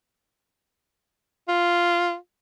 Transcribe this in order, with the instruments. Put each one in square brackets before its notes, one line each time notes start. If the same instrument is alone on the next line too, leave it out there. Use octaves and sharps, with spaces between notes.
[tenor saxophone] F4